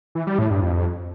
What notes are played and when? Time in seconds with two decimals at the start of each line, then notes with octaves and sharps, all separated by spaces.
0.15 E3
0.27 G3
0.39 A2
0.50 G2
0.62 F2